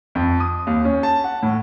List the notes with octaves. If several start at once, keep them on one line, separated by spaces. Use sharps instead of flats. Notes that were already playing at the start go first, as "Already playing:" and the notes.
F2
D#6
D#2
C#4
A5
F#5
A2